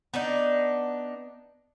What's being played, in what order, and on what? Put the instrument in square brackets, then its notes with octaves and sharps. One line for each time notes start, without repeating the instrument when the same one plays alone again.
[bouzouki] B3 D4 D#4